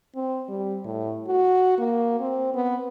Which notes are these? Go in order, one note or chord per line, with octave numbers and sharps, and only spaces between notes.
C4
G3
A2
F#4
A#3
C4
B3